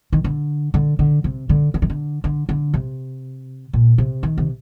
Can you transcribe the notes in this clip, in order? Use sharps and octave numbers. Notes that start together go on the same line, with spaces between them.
D#3
D3
D3
D3
C3
D3
D3
D#3
D3
D3
D3
C3
A#2
C3
D#3
C3